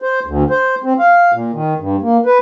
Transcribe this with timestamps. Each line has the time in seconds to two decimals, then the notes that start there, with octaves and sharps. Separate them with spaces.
0.02 C5
0.26 D2
0.50 C5
0.84 C4
0.99 F5
1.32 A#2
1.54 D#3
1.79 G2
2.02 A#3
2.26 B4